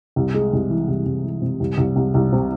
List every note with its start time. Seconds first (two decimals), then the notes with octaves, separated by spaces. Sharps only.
0.16 C2
0.34 G#3
0.53 C2
0.70 E3
0.88 C2
1.06 C2
1.24 E3
1.42 C3
1.60 C2
1.78 C2
1.96 C2
2.14 C2
2.32 C3